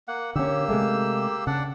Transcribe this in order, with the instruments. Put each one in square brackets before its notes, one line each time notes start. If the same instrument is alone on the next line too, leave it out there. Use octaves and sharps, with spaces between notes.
[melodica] A#3 F#5
[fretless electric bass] D3 C#4 [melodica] A#3 G4 E6
[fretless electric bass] C3 G#3 A3
[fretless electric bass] C#3 [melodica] D4 D5 F#5